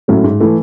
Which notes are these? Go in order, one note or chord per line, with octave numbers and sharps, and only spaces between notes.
A2 F#3 A3 C#4
G#2
E3 A3